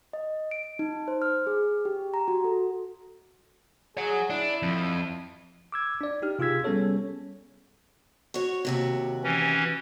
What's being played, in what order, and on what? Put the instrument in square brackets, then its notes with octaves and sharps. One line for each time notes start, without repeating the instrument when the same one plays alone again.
[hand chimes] D#5
D7
D#4
C5
F6
G#4
G4
A#5
F#4
A4
[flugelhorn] G#4 [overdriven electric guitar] C#5 F#5
[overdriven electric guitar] D4 [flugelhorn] E4
[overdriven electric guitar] F2
[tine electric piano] D6 E6 G#6
D4 D5
D#4 G4 F6
C3 F4 G#4 E6 G#6 B6
G3 B3 C#4 G#4 A4 C#5
[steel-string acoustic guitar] F#4 C#5
D#2 C3 F#4
[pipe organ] E3 C#4